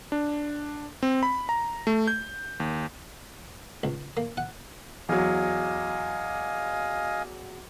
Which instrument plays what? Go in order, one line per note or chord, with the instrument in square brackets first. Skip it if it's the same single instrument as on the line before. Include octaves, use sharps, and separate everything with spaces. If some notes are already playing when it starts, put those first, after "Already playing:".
[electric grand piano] D4
C4
B5
A#5
A3
G6
D#2
[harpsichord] C#2
A#3
F#5
[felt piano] E2 F#3 [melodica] D#5 F5 G#5